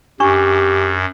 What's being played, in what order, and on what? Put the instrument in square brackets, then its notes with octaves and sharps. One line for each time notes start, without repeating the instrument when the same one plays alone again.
[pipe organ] F#2 [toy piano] D4 C#6 [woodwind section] G4